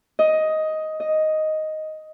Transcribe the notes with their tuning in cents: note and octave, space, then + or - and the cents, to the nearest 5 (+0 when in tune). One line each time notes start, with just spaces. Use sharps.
D#5 +10
D#5 +5